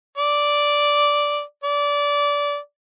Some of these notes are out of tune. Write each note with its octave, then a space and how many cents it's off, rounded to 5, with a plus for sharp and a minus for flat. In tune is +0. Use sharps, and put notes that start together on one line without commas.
D5 -5
D5 -20